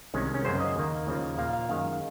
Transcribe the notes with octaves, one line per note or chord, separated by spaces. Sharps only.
C2 C3 D#3 G#3 C#4
C#4
F#2 C#3 F#3 A#3 C5
D#5
D#2 D#3 A#3
D#2 C#3 F3 A#3
A#2 F3 A#3 F5
F5
F#2 D#3 G#3 F5